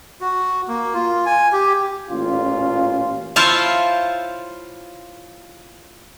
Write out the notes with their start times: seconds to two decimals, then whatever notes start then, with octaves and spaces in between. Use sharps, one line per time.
0.21 F#4
0.68 A#3
0.94 F4
1.26 G#5
1.52 G4
2.09 A1 A#2 C#4 F4
3.36 E4 F4 C5 C#5 F5 A5